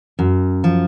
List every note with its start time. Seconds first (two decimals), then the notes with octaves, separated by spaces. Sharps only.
0.19 F#2
0.64 F3